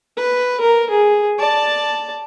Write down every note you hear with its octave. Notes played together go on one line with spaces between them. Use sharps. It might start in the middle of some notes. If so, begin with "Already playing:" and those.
B4
A#4
G#4
D5 A5